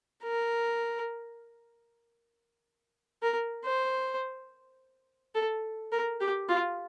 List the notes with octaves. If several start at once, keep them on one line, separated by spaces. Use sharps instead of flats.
A#4
A#4
C5
A4
A#4
G4
F4